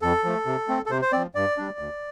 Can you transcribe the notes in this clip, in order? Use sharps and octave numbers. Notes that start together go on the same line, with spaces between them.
F2 A4
F3 A3
C3
A3 C4
A4
C3 C5
C5
F3 C4 D5
G2 D5
G3 D4
D2